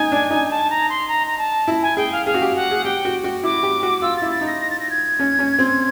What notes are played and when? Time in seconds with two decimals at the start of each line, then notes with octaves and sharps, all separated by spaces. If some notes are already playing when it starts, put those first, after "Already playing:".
Already playing: D#4 G#5
0.12 D4
0.30 D#4
0.51 A5
0.70 A#5
0.89 C6
1.08 A#5
1.27 A#5
1.38 A5
1.68 E4
1.82 G#5
1.97 G#4 G5
2.12 F5
2.26 G#4 F5
2.34 F#4
2.42 G4
2.56 F#5
2.71 G#4
2.84 G4 G5
3.05 F#4
3.24 F#4
3.43 E4 D6
3.63 G4
3.83 F#4
4.02 F4 E6
4.17 A6
4.22 E4
4.31 A6
4.41 D#4
4.47 A#6
4.61 A#6
4.71 A6
4.80 A#6
4.91 G#6
5.19 C#4
5.39 C#4
5.59 C4